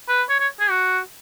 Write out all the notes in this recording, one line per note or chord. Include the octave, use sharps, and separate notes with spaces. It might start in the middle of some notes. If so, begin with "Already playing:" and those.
B4
C#5
C#5
G#4
F#4